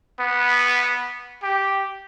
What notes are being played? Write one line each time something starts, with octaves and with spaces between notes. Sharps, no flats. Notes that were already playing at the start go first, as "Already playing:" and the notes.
B3
G4